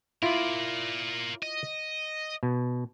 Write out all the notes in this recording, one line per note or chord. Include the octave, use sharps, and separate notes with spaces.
E4 F4 A#4 D5
D#5
B2